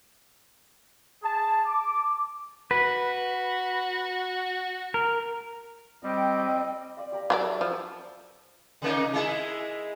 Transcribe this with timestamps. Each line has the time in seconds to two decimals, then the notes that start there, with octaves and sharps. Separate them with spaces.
1.23 G#4 A5
1.66 D6
2.71 F#4 B4
4.94 A#4
6.03 G3 C4 D#5 G5
6.97 D5 F5
7.12 G4 D5 A#5
7.30 F#3 G#4 A4 B4 D5 E5
7.61 F3
8.82 C3 A#3 D#4
9.13 G#3 E4 G#4